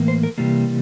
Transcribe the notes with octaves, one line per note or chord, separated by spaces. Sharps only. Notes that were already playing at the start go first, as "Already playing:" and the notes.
Already playing: A2 E3 A#3
C5
A#4
C3 E3 G3 A#3